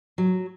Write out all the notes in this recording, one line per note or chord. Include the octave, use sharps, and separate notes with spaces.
F#3